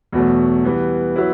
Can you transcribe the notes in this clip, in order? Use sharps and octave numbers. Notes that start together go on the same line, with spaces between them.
E2 B2 F#3 A3
E3 G3 B3
F#3 B3 E4 B4